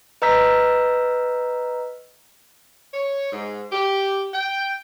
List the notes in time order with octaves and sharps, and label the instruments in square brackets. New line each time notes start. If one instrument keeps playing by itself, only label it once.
[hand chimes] B4 D#5 A#5 E6 G6 B6
[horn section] C#5
G#2
G4
G5